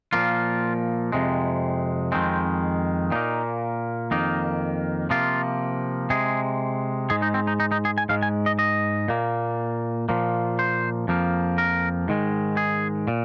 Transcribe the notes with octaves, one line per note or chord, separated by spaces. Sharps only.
A#2 F3 A#3 F4
F2 C3 G#3
F2 D#3 G#3 C4
A#2 A#3 D#4
F2 D#3 A#3 D#4
C3 F3 A#3 F4
C3 G#3 G#4
G#2 G#3 G#4
D#4
C4
D#4
D#4
D#4
G#4
G#5
G#2 G#3 F5
G#5
D#5
D#5
A#2 A#3
A#2 F3 A#3
C5
F2 F3 A#3
A#4
G#2 D#3 G#3
G#4
A#2